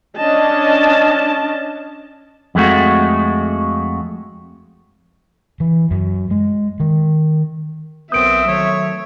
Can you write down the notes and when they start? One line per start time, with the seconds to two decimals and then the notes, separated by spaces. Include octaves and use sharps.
0.16 C#4 D4 D#5 A5
2.55 F2 G#3 A3 F#4
5.60 E3
5.91 F#2
6.31 G#3
6.80 D#3
8.12 B1 B3 C4 A#4 E5 D#6 G6 D7
8.45 D#3 F#3 A3 C#5